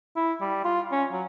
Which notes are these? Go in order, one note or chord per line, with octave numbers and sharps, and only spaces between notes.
E4
G3
F4
C#4
F#3